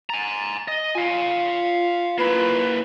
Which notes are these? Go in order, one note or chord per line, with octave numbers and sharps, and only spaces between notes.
G#5 A#5 A6
D#5
F4 F5 G#5
A#3 E4 B4